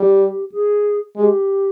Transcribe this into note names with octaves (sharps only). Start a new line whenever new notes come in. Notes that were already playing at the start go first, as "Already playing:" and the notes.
Already playing: G3
G4
G#4
G#3 G4